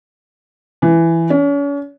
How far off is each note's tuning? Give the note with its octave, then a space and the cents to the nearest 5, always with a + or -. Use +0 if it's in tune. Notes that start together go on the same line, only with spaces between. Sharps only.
E3 +10
C#4 +40